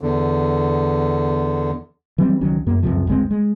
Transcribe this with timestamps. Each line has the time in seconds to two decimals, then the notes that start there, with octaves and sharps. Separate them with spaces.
0.01 E2 D3
2.18 E3 F#3 G3 C4
2.41 C#2 D#3 F#3 C#4
2.66 F#2 A#3
2.83 C#2 F#2 C3 F3
3.07 G1 C#2 G#3 C4
3.31 G#3